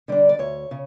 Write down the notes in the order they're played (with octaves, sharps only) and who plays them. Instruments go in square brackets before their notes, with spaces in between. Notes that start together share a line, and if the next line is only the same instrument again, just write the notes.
[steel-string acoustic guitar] D3 G3 D4
D5
D2 C#5
C#3